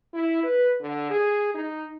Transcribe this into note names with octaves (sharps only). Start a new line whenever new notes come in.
E4
B4
D3
G#4
D#4